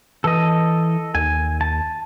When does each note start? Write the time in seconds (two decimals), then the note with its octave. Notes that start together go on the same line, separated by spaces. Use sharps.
0.24 E3 A4 D#5
1.15 D#2 G#5
1.61 A5